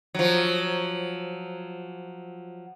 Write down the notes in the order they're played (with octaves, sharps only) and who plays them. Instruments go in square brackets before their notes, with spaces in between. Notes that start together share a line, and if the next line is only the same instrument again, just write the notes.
[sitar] F3 F#3